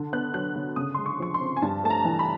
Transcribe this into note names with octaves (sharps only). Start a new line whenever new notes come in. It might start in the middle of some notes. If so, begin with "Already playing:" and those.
Already playing: D3
B3 F#6
F#3 F#6
D3
C#3 D#6
G#3 C6
C#6
F3 C#6
C6
C4
G#5
G2 A5
A3 A5
A#5
E3
B5